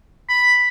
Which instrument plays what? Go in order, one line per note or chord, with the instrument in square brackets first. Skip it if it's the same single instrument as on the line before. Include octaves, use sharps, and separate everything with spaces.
[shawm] B5